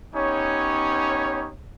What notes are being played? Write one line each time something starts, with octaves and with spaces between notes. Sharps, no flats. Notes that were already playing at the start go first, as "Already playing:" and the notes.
B3 C#4 D#4 G4 C#5